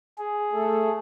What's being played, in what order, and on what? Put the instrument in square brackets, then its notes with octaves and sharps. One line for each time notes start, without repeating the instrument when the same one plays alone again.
[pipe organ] G#4
[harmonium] A3 A4